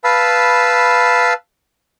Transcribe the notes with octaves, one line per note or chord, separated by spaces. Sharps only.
B4 F5 A5 B5 E6